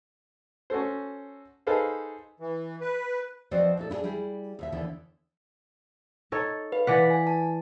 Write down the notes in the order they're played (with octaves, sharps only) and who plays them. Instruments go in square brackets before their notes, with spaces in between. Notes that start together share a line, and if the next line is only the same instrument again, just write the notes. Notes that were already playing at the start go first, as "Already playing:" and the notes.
[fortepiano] C#4 F#4 A4 C5
D#4 G#4 A4 B4 C5 F5
[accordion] E3
B4
[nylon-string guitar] F3 C4 F#4 B4 D5 D#5
A#2 E4 A4
D4 E4 F4 G#4 A4
G3 E4 G4 G#4
D#2 B2 E5
D#2 D3 E3 B3
[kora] D#4 A4 C#5
[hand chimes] B4 F5
[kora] E3 D5 F#5 [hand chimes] B6
[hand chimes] G#5
A5